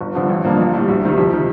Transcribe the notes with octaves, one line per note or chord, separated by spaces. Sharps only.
G1
G2 D3 F3
A1
G2 F3 A#3 D4
A#1
A2 G3
D2
C3 D#3 G3
F2
C3 D#3